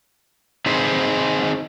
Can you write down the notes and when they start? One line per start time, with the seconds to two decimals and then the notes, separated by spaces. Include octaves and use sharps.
0.66 C4 D#4 G#4 B4 C5